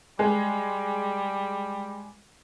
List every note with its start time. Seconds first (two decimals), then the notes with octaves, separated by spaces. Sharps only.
0.19 G3 G#3